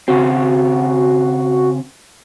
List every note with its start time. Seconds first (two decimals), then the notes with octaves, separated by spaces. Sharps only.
0.08 C#3 C4 F#4